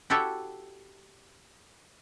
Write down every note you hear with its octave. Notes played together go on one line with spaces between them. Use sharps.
E4 F#4 G4 A4 C#5 E5